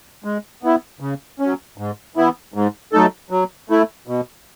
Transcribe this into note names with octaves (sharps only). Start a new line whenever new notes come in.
G#3
B3 E4
C#3
F#3 C#4
G#2
E3 B3 E4
G#2
F#3 A3 D#4 A4
F#3
A3 E4
B2